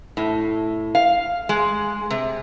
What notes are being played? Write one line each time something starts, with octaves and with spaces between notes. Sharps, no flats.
A2
F5
G#3
C3